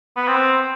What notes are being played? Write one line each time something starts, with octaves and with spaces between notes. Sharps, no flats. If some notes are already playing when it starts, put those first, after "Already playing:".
B3
C4